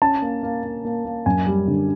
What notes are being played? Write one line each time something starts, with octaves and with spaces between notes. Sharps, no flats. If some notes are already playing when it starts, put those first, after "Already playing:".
C#4 A5
A#3
A#3
A#3
A#3
A#3
F#2 G#5
G3
D3